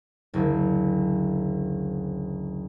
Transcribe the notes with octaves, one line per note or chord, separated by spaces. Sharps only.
F#1 D2